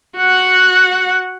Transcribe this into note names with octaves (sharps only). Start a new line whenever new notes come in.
F#4 F#5